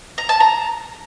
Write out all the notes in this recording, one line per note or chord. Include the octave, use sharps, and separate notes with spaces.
A#5
A5
A#5